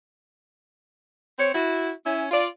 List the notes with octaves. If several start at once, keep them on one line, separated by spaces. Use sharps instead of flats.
C4 C#5
E4 F#4
C#4 E4
F4 D5